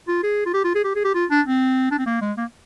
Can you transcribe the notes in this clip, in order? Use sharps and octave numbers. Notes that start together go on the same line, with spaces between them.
F4
G#4
F4
G4
F4
G#4
G4
G#4
G4
F4
D4
C4
D4
C4
A#3
G#3
A#3